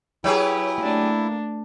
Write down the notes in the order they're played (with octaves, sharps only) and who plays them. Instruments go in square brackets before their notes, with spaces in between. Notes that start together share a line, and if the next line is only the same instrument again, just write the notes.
[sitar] F#3 G4 G#4 [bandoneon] E4 [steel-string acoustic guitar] B4 C#5 G5
[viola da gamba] A3 D4 [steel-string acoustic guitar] A#3